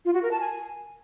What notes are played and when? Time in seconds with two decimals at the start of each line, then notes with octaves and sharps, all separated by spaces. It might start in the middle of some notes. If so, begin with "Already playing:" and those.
0.05 F4
0.14 F#4
0.23 A#4
0.31 A5
0.40 G#5